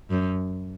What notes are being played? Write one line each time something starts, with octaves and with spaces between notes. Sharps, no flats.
F#2